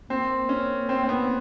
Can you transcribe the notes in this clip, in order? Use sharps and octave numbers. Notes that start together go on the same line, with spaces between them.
A#3 C4
C#4
C4
C4
B3